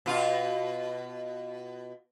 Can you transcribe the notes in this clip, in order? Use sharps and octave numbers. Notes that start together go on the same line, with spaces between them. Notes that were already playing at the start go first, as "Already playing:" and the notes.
B2 F4